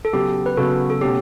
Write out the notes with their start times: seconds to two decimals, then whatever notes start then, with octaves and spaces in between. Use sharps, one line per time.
0.05 A4
0.13 C#3 F#3 B3 G4
0.46 B4
0.57 C#3 F#3 B3 F#4 A4
0.90 A4
1.01 B2 A3 C#4 G4